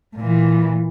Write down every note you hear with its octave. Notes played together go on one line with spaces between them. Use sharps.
A#2 E3